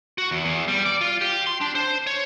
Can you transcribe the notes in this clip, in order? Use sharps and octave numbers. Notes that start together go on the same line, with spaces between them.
F#4
E2
E2
G3
D5
F4
G4
C6
D4
C5
C#5